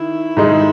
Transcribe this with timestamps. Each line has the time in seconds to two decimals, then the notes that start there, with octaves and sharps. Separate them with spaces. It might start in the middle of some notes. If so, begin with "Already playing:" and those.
Already playing: D#3 E4
0.37 G#2 D#3 G#3 D#4